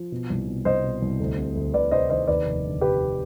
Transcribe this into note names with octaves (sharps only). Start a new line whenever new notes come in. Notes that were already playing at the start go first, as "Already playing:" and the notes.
Already playing: F3
B2
C2
B2
C2 C5 D#5
B2
C2
D2
C3
D2
D2 B4 D5
C3 C5 D#5
D#3 C5 D#5
D#2 B4 D5
F1
D3
F1 G4 B4